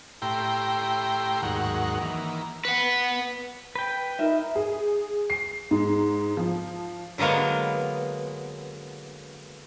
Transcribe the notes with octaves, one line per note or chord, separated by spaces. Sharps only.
A2 E4 G4 G5 A#5 C6
D#2 G#2 F#3 A#4 F#5
D#3 E3 A#3
B4 F#5
B4 G5
D#4 A#4 E5
G#4
C7
G#2
F3
D3 F#3 G#3 A#3 B3